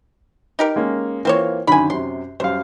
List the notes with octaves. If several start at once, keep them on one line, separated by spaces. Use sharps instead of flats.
D#4 G4 A#4
G#3 A#3 C#4
E3 A#3 C4 F4 C5 C#5
F#2 D3 D#3 G#5 B5
F#2 C3 C6
F#2 G3 C5 F5